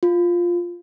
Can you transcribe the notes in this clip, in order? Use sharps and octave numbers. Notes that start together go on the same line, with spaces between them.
F4